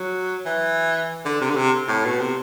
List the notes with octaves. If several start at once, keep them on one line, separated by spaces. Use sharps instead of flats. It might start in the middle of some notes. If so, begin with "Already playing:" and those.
Already playing: F#3
E3
D3
C3
D3
C3
A2
B2
C3